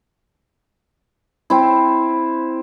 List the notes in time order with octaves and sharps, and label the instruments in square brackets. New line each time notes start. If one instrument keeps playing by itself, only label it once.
[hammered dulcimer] C4 E4